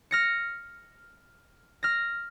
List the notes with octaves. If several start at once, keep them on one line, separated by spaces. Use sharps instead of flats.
F6 A#6 C#7
F6 A#6